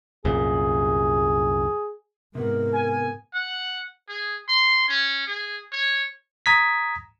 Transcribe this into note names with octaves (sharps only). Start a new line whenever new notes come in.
C2 F#2 A#2 G#4
G#2 C3 B3 F#4 A#4
G#5
F#5
G#4
C6
C#4
G#4
C#5
A#5 D#6 G#6 B6